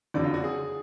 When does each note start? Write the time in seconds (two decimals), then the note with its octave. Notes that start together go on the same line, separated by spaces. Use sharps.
0.14 F#1 F2 D3 F#3 D5
0.24 F4
0.34 F#4
0.44 G#4